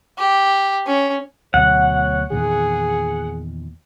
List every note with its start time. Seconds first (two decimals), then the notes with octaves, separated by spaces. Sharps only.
0.18 G4
0.86 C#4
1.54 D2 B2 F#3 C#5 F#5
2.32 E2 A#2 D#3 G#4